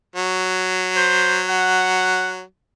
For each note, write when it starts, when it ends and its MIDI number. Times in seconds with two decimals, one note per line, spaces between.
0.16 2.42 54
0.97 1.39 72
1.49 2.36 78